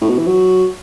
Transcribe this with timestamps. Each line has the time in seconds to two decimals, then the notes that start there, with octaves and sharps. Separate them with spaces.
0.01 A2
0.09 B2
0.18 E3
0.27 F#3